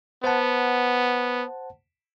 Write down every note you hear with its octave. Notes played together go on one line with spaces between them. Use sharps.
B3 C5 F#5 A5